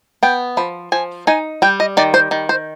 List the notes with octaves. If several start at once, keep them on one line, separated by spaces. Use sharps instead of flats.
B3 G5
F3 B5
F3 G#5
D#4 G#5
G3 G5
D#5
D#3 D5
C5
D#3
C5